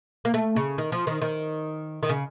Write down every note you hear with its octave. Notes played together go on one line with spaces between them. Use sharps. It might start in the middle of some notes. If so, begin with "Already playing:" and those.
A#3
A3
C#3
D#3
F3
D#3
D#3
D#3
C#3